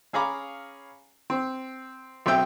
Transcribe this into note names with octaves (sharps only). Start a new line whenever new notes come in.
C#4 G#4 F5 A#5 B5 D6
C4
B1 C4 E5 G5 E6